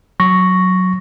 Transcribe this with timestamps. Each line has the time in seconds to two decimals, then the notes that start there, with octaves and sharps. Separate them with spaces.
0.20 F#3 C#6 A#6